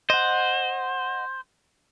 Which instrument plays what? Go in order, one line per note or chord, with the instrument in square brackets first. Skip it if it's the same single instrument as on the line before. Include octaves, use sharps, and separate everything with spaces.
[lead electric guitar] C5 [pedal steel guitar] D#5 F#5